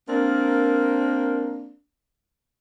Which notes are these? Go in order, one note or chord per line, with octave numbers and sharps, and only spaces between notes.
A#3 C4 D4 A#4